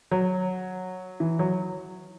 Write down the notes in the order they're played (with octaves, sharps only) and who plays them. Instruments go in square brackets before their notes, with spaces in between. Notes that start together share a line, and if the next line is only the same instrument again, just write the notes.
[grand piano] F#3
E3
F#3